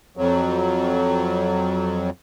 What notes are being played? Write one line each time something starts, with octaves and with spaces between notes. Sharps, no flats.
F2 F#3